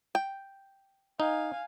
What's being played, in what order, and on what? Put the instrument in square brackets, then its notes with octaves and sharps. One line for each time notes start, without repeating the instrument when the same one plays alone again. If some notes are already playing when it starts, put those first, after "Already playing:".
[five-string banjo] G5
[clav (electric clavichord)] D#4 [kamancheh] F5 G#5